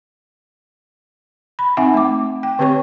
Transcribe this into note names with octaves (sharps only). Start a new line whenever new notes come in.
B5
C4 D#4 E5 F#5 G#5
A3 D6
G5
D3 C4 G4 B4 C#5 C#6